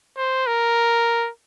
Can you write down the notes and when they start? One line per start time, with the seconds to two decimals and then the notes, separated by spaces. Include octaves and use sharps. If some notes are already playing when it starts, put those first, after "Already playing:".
0.17 C5
0.47 A#4